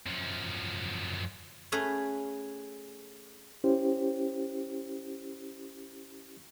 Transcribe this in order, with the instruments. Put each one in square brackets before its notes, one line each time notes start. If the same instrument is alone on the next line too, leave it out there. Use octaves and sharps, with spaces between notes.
[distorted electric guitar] F#2 F3
[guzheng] A3 C#4 G#4 B4
[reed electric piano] C#4 E4 G4 C5